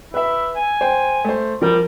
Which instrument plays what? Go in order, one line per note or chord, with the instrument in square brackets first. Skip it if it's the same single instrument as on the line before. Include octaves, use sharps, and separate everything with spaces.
[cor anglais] E4 [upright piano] B4 E5
[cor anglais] G#5
[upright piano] C5 G5
A3 C5
[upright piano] F3 A#4 [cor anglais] G3